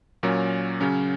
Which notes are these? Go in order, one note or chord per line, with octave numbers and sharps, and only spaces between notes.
A#2 F#3 C#4 A#4 C#5
C#3 F#3 C#4